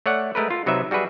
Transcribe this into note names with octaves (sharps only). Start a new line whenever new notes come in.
A3 C#5 D5 F#5
G#3 A3 A#4 B4
F4
C3 F#3 D#4 B4 E5
G3 F#4 G#4 B4 E5